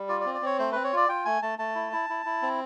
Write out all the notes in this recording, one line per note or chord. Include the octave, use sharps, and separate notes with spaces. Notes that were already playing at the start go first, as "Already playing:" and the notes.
Already playing: G3
F4 D5
D5
C4
D5
C4 C#5
A3 C5
C4 B4
C#5
F4 D5
F4 G5
A3 G#5
A3 A5
A3 A5
E4
E4
E4
E4
C4